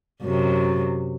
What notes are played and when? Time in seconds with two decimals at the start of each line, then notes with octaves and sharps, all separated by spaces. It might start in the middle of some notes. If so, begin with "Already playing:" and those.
0.22 F#2 C3